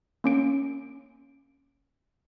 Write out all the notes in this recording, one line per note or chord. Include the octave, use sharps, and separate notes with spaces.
A#3 C#4 D7